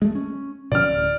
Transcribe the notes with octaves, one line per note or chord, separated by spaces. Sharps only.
G#3 A3
C#4
B2 F3 C#4 D5 F6
D1